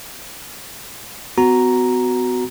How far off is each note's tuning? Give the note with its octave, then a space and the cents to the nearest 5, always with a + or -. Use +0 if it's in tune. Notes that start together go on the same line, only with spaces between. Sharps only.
B3 +35 F#4 +0 A#5 +0